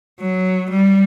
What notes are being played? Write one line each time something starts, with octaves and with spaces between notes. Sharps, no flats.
F#3
G3